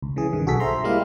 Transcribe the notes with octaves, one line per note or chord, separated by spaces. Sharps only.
C#2
C#3 E3 G#4
G2 D#3
B1 F#4 G#4 A4 B6
C5 E5 A#5 C6
G3 G#3 A#3 E4 G4 F5